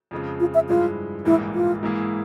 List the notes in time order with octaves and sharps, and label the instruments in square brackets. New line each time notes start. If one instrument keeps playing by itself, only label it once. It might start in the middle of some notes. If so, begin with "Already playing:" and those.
[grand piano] F2 C#3 F3 G#3
[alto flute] F4
E5
[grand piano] G2 F3 G#3 E4 [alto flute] F4
[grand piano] A#1 G#2 E3 G3 A#3 [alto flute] E4
[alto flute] F4
[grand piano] G#2 E3 A#3 E4 G#4